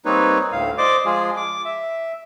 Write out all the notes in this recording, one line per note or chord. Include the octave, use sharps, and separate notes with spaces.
G3 A#3 C4 D#4 B4 C#5
D2 A2 F5
C5 D5 D#5 D6
F3 G#3 F4 G#4
D6
E5